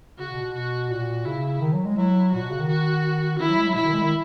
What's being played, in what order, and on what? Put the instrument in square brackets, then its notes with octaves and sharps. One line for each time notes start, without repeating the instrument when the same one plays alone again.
[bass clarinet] C#3 [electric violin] F#4
[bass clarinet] B2
B2
[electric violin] F#4
[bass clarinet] A#2 [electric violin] F#4
[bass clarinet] C#3 [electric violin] E4
[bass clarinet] D#3
F#3
G#3
[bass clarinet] F#3 [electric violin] E4
[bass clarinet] A#2 [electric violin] F#4
[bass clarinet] B2
C#3
D#3
[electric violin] F#4
[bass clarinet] D#3 [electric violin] E4
[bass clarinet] F#3
G#3
F#3
[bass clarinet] B2 [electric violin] E4
[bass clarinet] D#3
G#3
D#3